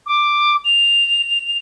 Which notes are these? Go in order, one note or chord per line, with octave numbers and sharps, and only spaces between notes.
D6
F7